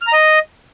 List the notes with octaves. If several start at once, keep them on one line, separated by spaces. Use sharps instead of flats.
F6
A#5
D#5